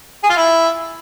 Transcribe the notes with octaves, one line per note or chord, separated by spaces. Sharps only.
G#4
F4
E4